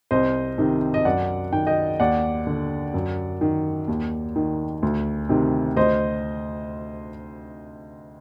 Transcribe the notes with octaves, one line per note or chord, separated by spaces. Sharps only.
C2 C5 D#5
C3 D#3
D#5
F#2 D5 F#5
D#3 G5
D#5 G5
D#2 D5 F#5
D3
F#2
D#3
D#2
D#3
D2
C3 D#3
D2 C5 D#5